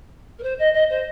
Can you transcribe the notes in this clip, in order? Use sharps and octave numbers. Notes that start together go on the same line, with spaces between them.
A#4
C5
D#5
D#5
C5